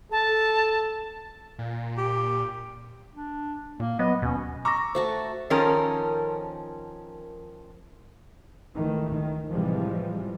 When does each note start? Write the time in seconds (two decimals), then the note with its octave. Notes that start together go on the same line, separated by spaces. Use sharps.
0.12 A4 A5
1.59 A#2
1.98 G4
3.15 D4
3.80 A#2 A#3
3.99 F#3 B3 D#5
4.22 D#2 B2 C#4
4.65 A#5 C#6 D6 E6 A#6
4.95 A3 F#4 C5 A5
5.50 D#3 F3 C#4 A4 A#4
8.75 C#2 D#3 E3 A3
9.15 D#3
9.51 A2 C3 E3 F3 G3 G#3